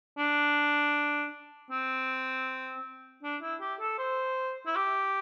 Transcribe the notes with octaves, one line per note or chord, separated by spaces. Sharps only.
D4
C4
D4
E4
G4
A4
C5
E4
G4